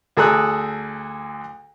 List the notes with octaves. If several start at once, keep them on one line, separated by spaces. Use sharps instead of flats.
D2 G#4 A4 A#5 D#6 F#6